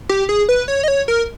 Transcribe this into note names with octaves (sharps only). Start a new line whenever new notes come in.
G4
G#4
B4
C#5
D#5
C#5
A#4